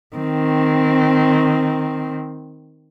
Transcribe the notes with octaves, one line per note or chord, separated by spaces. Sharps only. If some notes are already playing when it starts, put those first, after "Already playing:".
D#3 C4